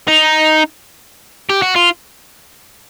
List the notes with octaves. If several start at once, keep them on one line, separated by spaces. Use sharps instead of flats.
D#4
G4
F#4
F4